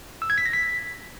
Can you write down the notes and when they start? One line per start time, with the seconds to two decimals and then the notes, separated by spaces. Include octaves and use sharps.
0.22 E6
0.30 G#6
0.38 B6
0.46 A#6
0.53 B6